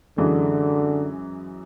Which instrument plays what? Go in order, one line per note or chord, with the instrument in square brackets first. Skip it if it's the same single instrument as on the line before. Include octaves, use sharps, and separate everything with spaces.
[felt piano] F#2 E3 G#3 [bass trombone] D3